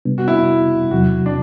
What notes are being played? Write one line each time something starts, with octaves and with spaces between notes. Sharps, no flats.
C3 G3 B3 D4
F#4
E4
E2 C3 F#3 F#4
D4